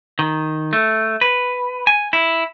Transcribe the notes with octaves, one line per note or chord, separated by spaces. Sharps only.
D#3
A3
B4
G#5
E4